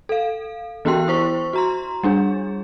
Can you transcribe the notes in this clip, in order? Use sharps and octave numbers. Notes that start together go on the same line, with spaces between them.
A4 F5
E3 B3 F#4 G4 G5 C6
E4 C5 C#6
F#4 A#5 C6
G3 D4 G#4